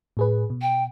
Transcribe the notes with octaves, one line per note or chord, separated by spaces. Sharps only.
A2 G#4 B4
B2
G5